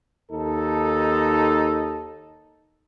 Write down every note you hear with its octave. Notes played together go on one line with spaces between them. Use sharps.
D#2 D#4 A4